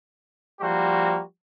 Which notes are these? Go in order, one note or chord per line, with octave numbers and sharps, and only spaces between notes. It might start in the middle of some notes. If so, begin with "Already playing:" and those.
F3 G3 A#3 F#4 C5